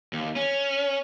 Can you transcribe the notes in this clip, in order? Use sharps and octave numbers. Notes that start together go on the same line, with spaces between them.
D#2
C#4